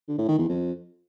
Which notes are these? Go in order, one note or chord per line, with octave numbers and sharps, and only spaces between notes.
D3
A2
D#3
E2
F2